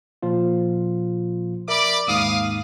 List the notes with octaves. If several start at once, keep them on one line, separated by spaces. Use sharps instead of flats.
A#2 F3 F4
A#4 D5 E5 B5 D6
D#2 G#2 F5 D#6